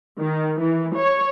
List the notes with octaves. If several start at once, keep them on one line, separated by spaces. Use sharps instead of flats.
D#3
E3
C#5